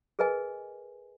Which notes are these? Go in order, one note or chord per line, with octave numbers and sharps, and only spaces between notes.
G#4 A#4 B4 D#5 G#5